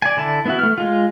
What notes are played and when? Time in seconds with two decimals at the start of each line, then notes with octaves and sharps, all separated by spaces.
0.02 D5 G#5
0.17 D3 E4 A5
0.46 B3 E4 F#4
0.59 A3 F6
0.78 G#3 F4